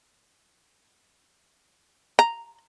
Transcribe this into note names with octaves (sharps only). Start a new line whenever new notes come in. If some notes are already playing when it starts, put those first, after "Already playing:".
A#5